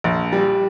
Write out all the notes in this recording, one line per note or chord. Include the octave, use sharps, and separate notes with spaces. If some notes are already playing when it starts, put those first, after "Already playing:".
A#1
G3